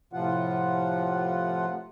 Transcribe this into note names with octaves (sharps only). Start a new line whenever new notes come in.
A2 C3 F3 F4 F#5